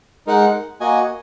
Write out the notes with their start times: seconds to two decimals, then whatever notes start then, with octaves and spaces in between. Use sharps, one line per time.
0.27 G#3 D#4 A#4 F#5
0.81 A#3 F#4 D#5 G#5